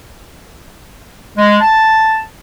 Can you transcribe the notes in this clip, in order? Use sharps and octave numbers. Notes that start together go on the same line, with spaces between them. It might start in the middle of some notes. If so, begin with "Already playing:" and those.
G#3
A5